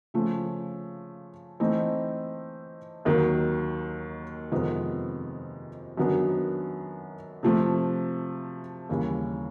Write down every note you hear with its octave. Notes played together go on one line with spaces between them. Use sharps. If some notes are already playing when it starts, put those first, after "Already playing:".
C#3 F3 A3
E3 A3 C4 D#4
D#2 D#3 F#3
F2 C3 D#3 G#3 B3
F#2 D#3 F#3 B3 D4
C3 F3 A3
D#2 C#3 E3 G3